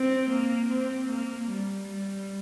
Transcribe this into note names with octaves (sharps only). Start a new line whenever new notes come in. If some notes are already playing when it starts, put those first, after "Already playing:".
Already playing: C4
A#3
C4
A#3
G3
G3